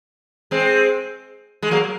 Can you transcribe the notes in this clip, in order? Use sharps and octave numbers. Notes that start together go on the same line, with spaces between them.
G#3 C4
G#3
F#3 A#3